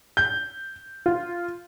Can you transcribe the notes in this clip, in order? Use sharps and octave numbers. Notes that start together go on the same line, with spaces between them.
G6
F4